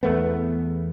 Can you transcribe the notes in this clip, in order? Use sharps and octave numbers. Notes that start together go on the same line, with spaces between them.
E2 A3 B3